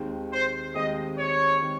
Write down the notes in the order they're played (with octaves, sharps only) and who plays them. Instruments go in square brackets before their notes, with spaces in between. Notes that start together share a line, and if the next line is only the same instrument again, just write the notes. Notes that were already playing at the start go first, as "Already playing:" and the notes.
Already playing: [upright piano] D#2 D#3 G#3 C4
[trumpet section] C5
[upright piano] D#2 D#3 G#3 C4 [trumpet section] D#5
[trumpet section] C#5
[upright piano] D#3 G#3 C4